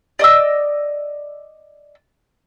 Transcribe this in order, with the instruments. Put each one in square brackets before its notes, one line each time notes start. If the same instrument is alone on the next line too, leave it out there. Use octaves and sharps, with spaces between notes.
[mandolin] D5 D#5 D6 E6